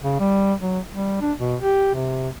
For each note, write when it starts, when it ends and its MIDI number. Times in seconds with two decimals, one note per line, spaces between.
0.02 0.18 49
0.20 0.53 55
0.59 0.80 54
0.91 1.18 55
1.21 1.32 62
1.38 1.56 47
1.61 1.94 67
1.94 2.29 48